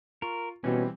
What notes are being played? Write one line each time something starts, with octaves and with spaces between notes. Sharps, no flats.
F4 A#4 C#6
B2 E3 G3 C4 C#4